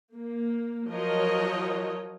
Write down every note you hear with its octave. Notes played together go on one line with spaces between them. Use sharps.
A#3
F3 F#3 F#4 A#4 C#5 D#5